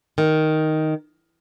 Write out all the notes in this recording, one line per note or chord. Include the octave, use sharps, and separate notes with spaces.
D#3